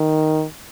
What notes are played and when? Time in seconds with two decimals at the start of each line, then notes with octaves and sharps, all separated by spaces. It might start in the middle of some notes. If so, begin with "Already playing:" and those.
Already playing: D#3